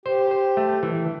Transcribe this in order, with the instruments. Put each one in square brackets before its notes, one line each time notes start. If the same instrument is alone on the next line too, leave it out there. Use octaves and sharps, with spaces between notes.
[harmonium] G4 [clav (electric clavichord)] C5
[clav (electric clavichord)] C5
A3
E3